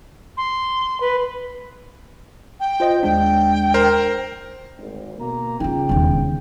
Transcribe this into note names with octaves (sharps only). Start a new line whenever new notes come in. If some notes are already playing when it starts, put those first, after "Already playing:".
C6
B4
G5
F4 C5 D#5
D#2 G#3 D4 G5
A#4 C5
G#1 D2
B2 A#3 A#5
C#3 E4 F4 G5
E1 D#2